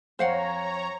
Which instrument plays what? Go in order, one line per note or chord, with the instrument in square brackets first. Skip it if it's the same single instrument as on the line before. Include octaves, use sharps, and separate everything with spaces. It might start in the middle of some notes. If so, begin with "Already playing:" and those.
[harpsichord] F2 [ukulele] C5 F5 F#5 [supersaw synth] C#5 A#5